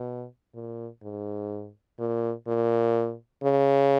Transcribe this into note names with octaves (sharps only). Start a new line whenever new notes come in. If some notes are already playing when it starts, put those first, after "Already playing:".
Already playing: B2
A#2
G#2
A#2
A#2
C#3